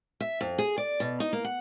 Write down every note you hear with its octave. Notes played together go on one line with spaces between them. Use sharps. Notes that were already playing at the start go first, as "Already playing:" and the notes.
E5
F2
G#4
D5
B2
D#4
A#3
F#5